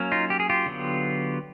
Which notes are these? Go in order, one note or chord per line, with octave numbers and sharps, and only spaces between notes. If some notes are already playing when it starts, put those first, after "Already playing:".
Already playing: F#3 A#3 C#4
D#4 F4
G4
G#4
F4 G4
D3 F#3 B3